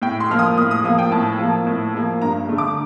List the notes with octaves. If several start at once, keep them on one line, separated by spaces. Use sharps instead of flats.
A2 G5
C6
F3 A#3 F6
D#6
A2 D#6
D#6
F3 A#3 D#6
G5
A2 A5
F3 A#3
A2
F3 A#3
G2 A#5
D3 A3
D6